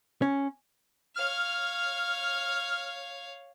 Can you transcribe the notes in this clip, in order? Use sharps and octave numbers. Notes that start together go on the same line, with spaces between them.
C#4
C#5 F5 F6